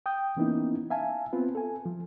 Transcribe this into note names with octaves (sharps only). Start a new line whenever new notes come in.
G5 D#6 G6
E3 A#3 B3 C#4 D#4 E4
E5 F5 G#5 A5
B3 C4 F4 B4
A4 G#5
F3